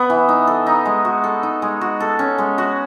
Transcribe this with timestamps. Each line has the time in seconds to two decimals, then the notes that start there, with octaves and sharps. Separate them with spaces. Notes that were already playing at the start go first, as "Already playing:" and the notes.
Already playing: B3
0.10 E3
0.29 D#4
0.47 A4
0.67 D#4
0.86 G#3
1.05 F#4
1.24 A4
1.43 D#4
1.62 G#3
1.81 F#4
2.00 A4
2.19 C#4
2.38 G#3
2.58 F#4